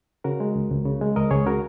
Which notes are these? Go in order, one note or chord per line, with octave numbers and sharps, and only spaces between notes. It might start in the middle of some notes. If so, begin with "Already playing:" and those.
C#3 F#4 A#4
G#3
C#2
C#2
C#3
G#3
C#2 A#4 D#5
C#2 G#4 C#5
C#3 F#4 A#4